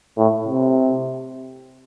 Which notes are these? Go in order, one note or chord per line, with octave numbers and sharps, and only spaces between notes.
A2
C3